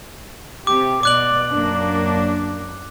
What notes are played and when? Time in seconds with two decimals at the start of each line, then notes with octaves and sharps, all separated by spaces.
0.67 C3 G4 D6
1.03 B2 D5 D6 F#6 F#7
1.52 F#2 A#3 D4